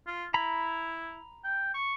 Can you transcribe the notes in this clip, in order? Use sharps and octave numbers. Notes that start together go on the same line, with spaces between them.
F4
E4 A#5 B5
G5
C#6